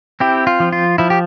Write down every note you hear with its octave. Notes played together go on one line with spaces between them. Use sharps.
C4 E4 G4
F4
F3
F4
F3 E4
G4